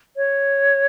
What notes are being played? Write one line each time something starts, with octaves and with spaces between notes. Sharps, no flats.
C#5